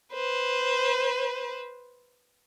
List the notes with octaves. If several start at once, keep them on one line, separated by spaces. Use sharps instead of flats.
B4 C5